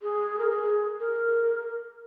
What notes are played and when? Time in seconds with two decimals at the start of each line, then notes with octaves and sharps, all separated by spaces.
0.02 G#4
0.39 A#4
0.50 G#4
1.00 A#4